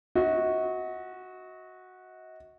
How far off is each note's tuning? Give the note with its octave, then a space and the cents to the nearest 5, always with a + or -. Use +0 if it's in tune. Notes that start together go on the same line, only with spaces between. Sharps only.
F#4 -5 D#5 +40